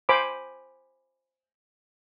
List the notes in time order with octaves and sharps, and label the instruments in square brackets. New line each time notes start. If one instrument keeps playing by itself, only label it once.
[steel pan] C5 G#5 B5 D6